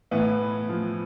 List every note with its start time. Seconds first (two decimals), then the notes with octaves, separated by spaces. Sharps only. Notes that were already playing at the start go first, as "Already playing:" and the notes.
0.11 A2 E3 B3
0.69 F3